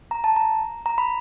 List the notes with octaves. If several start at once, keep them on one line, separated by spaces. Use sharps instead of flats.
A#5
A5
A#5
A#5
B5